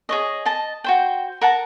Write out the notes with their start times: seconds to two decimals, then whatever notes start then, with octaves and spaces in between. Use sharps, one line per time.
0.09 G#4 C#5 D#5
0.45 D#5 A5
0.84 F#4 C5 G5
1.41 A#4 F#5 A5 A#5